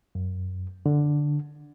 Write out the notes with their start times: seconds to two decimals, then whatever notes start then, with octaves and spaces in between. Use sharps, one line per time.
0.15 F#2
0.86 D3